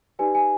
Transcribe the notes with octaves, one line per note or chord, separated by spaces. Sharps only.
D#4 G4 B4 D5 G#5
G#5